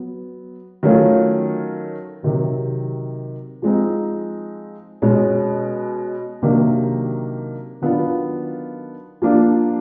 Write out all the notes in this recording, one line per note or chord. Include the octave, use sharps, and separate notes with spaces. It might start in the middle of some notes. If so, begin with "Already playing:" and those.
Already playing: F#3 B3
D#3 F#3 A3 C#4 F4
C3 D#3 F#3
F3 G#3 C4 D#4
B2 G#3 C#4
C3 D#3 F#3 A#3 D4
D#3 F#3 B3 D4 F4
F3 A#3 D4 F4